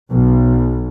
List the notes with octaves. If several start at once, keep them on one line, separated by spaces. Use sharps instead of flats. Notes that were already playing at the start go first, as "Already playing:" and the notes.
B1